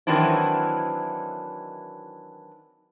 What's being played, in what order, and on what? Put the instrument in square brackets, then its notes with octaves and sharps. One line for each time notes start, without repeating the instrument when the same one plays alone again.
[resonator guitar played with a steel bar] D#3 E3 F#3 C4 D4 E4